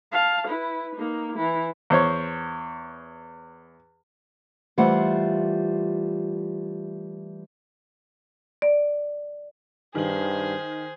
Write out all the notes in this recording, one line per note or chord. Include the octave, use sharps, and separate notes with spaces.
F5 A5
E4 B4
A#3 D#4
E3 E4
E2 C5 C#5
E3 G3 A3 F4 C5 F#5
D5
G2 D#3 G#4 C5 F#7